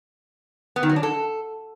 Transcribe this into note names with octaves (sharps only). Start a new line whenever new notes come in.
B3
D#3
F#3
D4
A4